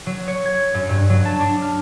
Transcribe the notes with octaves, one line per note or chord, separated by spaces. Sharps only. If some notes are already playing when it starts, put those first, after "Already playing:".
F#3
C#5
G#6
F#2
G2
F#3
A5
D4
F6